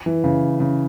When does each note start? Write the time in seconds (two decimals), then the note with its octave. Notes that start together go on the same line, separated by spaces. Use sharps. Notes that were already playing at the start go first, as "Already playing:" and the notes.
0.06 E3
0.24 C#3
0.60 C#3